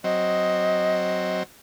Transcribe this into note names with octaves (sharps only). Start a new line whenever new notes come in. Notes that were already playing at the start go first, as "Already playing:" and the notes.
F#3 C4 D#5